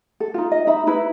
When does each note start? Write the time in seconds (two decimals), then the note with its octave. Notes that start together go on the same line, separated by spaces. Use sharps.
0.20 A4
0.34 D#4 F4
0.52 D#5
0.67 D#4 E5 B5
0.87 D#4 E4 B4